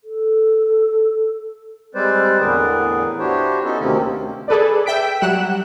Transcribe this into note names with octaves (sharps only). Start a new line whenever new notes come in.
A4
G3 G#3 C4 B4 C5 D5
E2 A2 D3 G#4 A#4 B4
D4 E4 F#4 G4 C5 C#5
B3 C#4 D#4 F#4 A4
D2 C3 D#3 A#3 C4 C#4
G#4 A4 B4 D5
E5 G5 B6 D7
F#3 G3 F#5 F#6 E7